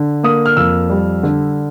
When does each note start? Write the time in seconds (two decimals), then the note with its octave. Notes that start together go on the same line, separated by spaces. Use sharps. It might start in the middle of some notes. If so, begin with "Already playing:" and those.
Already playing: D3
0.24 A#3 D#6
0.46 F6
0.57 F2 E6
0.90 G3
1.23 D3